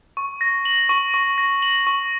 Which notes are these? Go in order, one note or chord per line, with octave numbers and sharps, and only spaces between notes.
C#6
A#6
F#7
C#6
C#6
A#6
F#7
C#6